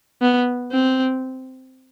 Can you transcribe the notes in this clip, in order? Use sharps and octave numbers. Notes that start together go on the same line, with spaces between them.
B3
C4